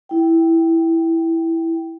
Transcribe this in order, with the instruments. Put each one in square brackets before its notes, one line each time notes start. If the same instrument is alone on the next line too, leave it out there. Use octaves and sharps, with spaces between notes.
[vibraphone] E4 G5